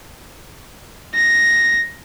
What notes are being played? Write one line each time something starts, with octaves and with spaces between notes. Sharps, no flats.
A#6